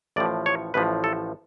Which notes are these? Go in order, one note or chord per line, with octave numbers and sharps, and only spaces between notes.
A1 A2 F3 D5
C#5
A1 A2 F3 B4
A4